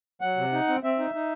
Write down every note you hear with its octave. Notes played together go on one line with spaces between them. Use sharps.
F#3 F#5
C3
D#4
C4
C4 E5
D#4
D#4